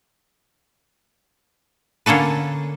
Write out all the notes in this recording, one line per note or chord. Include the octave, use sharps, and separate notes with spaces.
D3 A#3 C#4 A4 B4